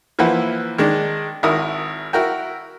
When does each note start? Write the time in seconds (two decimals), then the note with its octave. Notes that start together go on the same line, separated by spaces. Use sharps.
0.19 E3 F3 A#3 E4 B4 F#5
0.78 D#3 G#3 D4
1.43 G#1 E4 F#4 A#4 D#6
2.13 E4 F#4 A#4 G5